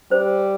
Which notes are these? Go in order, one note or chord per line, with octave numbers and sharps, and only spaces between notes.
G3 C5